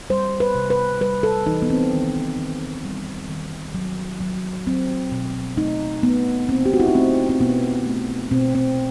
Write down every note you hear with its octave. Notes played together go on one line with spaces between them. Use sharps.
G3 C5
B4
C3
B4
G3 B4
A4
E3 D#4
B3
C4
D#3
D#3
G3
D#3
F#3
F#3
F#3 C4
B2
A3 D#4
A3 B3
B2 C4
G4
F#4
E4
D#4
A3 C4
C4
B2 B3
A3
B2 C4
C4